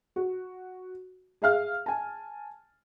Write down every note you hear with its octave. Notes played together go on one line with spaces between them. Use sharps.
F#4
G#4 E5 F5 F6
G#5 A5